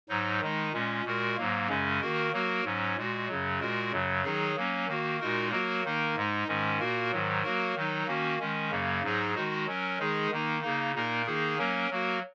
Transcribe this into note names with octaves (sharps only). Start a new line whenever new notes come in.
G#2 F#3 D#4
D#3 G#3 D#4
A#2 G#3 C#4
A#2 G#3 F#4 A#4
G#2 F#3 A#3
F#2 C#3 G#3 C#4
D#3 A#3 F#4 A#4
F#3 A#3 F#4 A#4
G#2 F#3 C#4
A#2 G#3 F#4
F#2 C#3 F#3
A#2 G#3 F#4 A#4
F#2 C#3 F#3
D#3 F#3 D#4 G#4
F#3 A#3 C#4
D#3 A#3 F#4
A#2 G#3 D#4 F#4 A#4
F#3 A#3 F#4 A#4
D#3 A#3 D#4 A#4
G#2 G#3 D#4
G#2 D#3 G#3 C#4
A#2 A#3 F#4 A#4
G#2 D#3 F#3
F#3 A#3 F#4 A#4
D#3 F#3 D#4
D#3 A#3 C#4 F#4
D#3 G#3 C#4
F#2 C#3 F#3 A#3
G#2 F#3 D#4 G#4
D#3 G#3 D#4 F#4
F#3 C#4 A#4
D#3 G#3 D#4 G#4
D#3 A#3 D#4
C#3 A#3 D#4
A#2 A#3 D#4 A#4
D#3 A#3 D#4 G#4
F#3 A#3 C#4 A#4
F#3 A#3 F#4 A#4